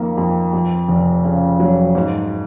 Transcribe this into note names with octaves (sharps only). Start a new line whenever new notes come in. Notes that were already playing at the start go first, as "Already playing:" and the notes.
Already playing: F2 D#3 A#3
F2
F2
F1
C#3
F#3
G#2